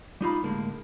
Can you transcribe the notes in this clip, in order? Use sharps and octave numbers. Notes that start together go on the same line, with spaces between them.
G3 D#4 F4 B5
A2 D3 G#3 A#3